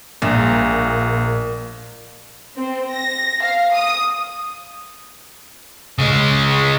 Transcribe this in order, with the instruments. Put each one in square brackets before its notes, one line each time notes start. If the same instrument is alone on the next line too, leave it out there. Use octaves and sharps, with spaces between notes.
[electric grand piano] A#1 [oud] A#2
[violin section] C4
A#6
F5
D#6
[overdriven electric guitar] C#3 G#3